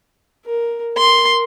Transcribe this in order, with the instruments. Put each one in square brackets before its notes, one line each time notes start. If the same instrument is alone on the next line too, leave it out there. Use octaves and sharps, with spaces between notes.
[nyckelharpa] A#4
[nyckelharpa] A#4 [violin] C6